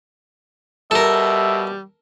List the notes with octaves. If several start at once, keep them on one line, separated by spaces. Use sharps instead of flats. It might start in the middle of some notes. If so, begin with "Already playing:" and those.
B2 G3 A4 A#4 E5